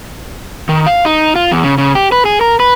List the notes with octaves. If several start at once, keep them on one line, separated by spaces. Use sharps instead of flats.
D#3
F5
D#4
F4
E2
C#3
C#3
G4
B4
G#4
A#4
B4